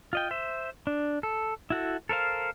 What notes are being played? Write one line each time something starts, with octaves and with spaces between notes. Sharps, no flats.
F4 D#5 G5
C5 E5
D4
A4
E4 F#4 A4
A4 A#4 C5 F5